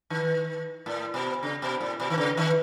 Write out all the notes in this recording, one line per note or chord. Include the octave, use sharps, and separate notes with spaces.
D#3
A2
B2
C#3
B2
A2
B2
D#3
C#3
D#3